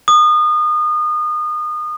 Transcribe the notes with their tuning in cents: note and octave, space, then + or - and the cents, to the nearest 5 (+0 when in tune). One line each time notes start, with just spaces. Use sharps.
D#6 -30